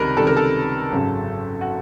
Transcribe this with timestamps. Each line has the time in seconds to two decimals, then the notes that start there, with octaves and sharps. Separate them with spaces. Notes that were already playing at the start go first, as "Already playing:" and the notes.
Already playing: C#2 C3 D#3 G3 A#4 B4
0.17 C#2 C3 D#3 G3 A4
0.27 A#4
0.37 A4
0.92 G#1 F#2 C#3 F#3
1.61 F#4